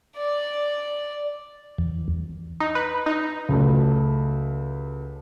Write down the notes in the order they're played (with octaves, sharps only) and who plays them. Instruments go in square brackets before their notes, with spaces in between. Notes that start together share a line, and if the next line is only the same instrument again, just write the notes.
[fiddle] D5
[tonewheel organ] E2
[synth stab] D#4
B4
D#4
[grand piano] C#2 F#3 A3